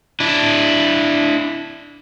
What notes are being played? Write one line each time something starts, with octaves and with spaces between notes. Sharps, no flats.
D4 E4